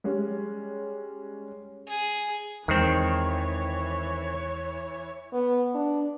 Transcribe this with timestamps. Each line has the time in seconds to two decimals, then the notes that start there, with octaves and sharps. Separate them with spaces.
0.04 G3 G#3 C#4
1.88 G#4
2.68 E2 D#3 E3 G#3 C4 C#5
5.33 B3
5.75 D4